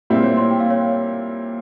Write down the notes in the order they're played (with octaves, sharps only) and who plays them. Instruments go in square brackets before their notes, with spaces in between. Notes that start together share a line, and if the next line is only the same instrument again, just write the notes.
[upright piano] A#2 G3 C4 E4
[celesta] C#5
C6
G5
F5
C#5